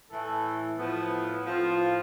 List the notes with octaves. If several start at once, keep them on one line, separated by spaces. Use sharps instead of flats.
A2 E3 A3 E4 A4
A2 F3 B3 E4
A2 F3 C4 F4